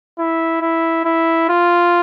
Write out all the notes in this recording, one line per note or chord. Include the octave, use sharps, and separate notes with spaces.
E4
E4
E4
F4